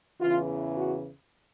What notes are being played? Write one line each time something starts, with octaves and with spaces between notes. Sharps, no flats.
E2 C#3 E3 F4
F#4